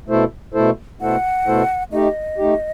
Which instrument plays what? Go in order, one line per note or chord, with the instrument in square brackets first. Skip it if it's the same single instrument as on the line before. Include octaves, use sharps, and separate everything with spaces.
[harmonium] B2 A3 E4 A4 C5
B2 A3 E4 A4 C5
[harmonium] B2 A3 E4 A4 C5 [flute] F#5
[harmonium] B2 A3 E4 A4 C5
[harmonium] A3 D#4 G4 [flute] D#5
[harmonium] A3 D#4 G4